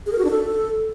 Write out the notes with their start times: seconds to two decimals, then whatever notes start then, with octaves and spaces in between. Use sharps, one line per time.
0.06 G#4
0.12 A#4
0.18 F#4
0.24 D4
0.31 A4